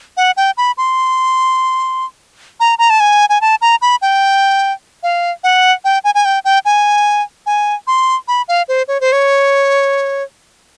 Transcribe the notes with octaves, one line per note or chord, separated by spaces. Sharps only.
F#5
G5
B5
C6
A#5
A#5
A5
G#5
G#5
A5
A#5
B5
G5
F5
F#5
G5
G#5
G#5
G5
G5
G#5
G#5
C6
B5
F5
C5
C#5
C5
C#5